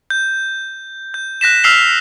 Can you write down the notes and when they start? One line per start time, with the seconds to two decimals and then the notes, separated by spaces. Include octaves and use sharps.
0.10 G6
1.14 G6
1.41 F#6 A#6 B6 E7
1.64 E6 F6 B6 C7 F7 G7